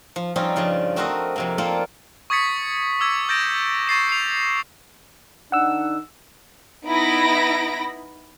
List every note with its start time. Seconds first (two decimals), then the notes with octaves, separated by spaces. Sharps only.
0.16 F3
0.36 F3 G3 C4 C#4 D#4 F4
0.56 G2 C#3 F3 D5
0.96 A3 C4 F#4 A#4 C5 D#5
1.36 F2 C3 A#3
1.58 A#3 C4 F4 A4 C5 D5
2.30 C#6 D#6 G#6 A6 B6 C#7
3.00 D6 E6 G#6
3.29 E6 G6 A6 A#6 D7 E7
3.87 C#6 A6 C7 E7
4.09 C7 F7
5.52 D#3 D4 D#4 F#5 E6
6.86 B3 D#4 E4 B5 A#6 D7